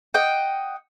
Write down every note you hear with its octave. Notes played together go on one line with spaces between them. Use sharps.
D#5 F#5 G5